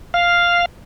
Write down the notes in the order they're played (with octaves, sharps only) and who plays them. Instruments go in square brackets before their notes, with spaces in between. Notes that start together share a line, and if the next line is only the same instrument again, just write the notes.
[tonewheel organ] F5